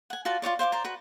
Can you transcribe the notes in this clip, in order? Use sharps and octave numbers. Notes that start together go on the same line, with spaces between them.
F#5 G#5
F4 F#4 D5 A5
F4 F#4 C#5 D5
C5 F5 C#6 D6
C5 D5 A#5
F#4 B4